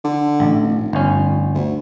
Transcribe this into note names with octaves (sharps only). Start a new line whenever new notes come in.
D3
A1
F1
G1 C#4
D2